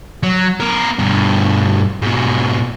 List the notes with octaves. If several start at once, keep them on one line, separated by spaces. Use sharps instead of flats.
F#3
B3 A#4
G2 B2
G#2 B2